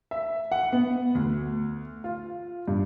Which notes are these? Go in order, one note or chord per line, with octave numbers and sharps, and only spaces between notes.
E5
F#5
B3
D2
F4
G2